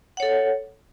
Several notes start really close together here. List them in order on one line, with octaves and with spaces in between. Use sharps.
F#5 C#5 A4